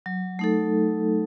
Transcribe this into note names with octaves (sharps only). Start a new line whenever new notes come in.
F#3
A3 D#4 A4